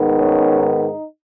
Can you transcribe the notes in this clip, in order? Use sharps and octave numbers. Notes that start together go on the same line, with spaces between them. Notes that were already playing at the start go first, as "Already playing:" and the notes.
Already playing: G#2 D#3 B3
C#4
D#4